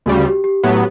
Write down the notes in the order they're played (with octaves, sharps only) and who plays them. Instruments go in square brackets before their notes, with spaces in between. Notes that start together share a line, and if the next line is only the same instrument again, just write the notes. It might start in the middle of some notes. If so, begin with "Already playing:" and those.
[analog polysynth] D2 C#3 G3 [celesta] F#4
[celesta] G4
G4
[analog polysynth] A2 F#3 B3 [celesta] G4